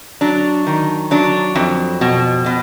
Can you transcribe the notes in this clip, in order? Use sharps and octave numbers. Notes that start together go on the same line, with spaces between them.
F#3 D4
D#3
F#3 D4
F2
B2
B2